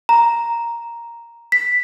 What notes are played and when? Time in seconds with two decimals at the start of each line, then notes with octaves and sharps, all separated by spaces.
0.09 A#5
1.52 B6